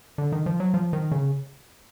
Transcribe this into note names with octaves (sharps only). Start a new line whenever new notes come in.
D3
D#3
F3
F#3
F3
D#3
C#3